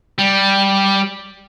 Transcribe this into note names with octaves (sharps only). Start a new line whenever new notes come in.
G3